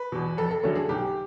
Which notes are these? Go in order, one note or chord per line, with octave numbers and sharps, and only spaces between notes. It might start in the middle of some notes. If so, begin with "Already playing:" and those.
Already playing: B4
E2 B2
F2 A4
A4
D3 F#3 A3 C#4 A4
G#4
B1 G4